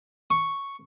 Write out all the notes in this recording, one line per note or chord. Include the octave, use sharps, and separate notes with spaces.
C#6